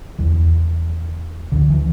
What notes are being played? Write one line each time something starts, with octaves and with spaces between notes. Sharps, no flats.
E2 E3
D2 D3
E3